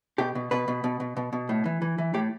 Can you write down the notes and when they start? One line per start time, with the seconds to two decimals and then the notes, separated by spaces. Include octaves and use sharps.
0.18 B2 G4
0.35 B2
0.51 B2 B4
0.68 B2
0.84 B2
1.00 B2
1.17 B2
1.33 B2
1.49 A2
1.65 E3
1.82 E3
1.98 E3
2.14 A2 G4